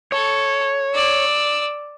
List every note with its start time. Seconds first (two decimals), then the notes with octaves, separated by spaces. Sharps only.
0.12 A4 C#5
0.94 D5 E6